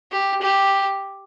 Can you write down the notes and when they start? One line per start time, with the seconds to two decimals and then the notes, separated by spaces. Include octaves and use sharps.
0.12 G4
0.41 G4